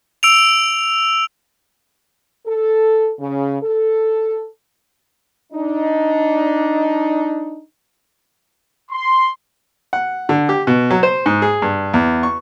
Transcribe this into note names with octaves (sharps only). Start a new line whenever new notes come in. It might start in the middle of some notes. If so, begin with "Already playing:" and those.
E6 D7 F7
A4
C#3
A4
D4 D#4
C6
F#5
D3
G4
B2
F#3
C5
G#2
G#4
G2
E2
C#6